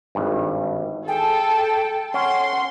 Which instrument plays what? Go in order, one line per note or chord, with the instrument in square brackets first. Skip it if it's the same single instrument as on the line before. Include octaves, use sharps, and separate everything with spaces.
[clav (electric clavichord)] G#1 G2
[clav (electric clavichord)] G#4 [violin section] A4 [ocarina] G5
[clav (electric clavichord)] C#4 [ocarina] F#5 [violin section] C6